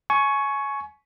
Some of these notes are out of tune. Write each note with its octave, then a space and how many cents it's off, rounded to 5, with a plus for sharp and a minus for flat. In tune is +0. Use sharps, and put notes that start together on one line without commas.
G#5 +25 C#6 +0